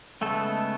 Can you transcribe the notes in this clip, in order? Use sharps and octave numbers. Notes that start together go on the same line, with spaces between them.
C#3 G#3 A3 B3 A4